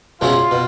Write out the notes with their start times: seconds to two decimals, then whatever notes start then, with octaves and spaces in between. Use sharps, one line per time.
0.21 E2 B2 G#3 C#4 E4 F4
0.51 B2